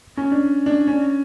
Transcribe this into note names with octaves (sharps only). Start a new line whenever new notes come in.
C#4
D4
D4
C#4